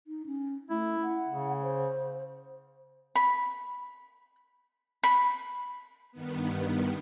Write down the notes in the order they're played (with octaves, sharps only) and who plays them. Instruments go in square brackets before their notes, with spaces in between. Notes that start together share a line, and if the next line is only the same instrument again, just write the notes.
[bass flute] D#4
C#4
[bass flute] A3 [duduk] E4
[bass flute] F#5
[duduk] C#3
[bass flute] C5
[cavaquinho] B5
B5
[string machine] G2 D#3 B3